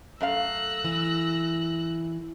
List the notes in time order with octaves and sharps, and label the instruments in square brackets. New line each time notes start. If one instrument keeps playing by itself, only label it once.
[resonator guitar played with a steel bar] F#2 A3 F5 [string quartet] E6 F#6 A#6
[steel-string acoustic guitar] E3